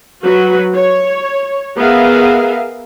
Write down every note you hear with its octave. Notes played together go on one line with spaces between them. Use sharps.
F#3 F#4 B4
C#5
B3 G#4 A#4 E5 F5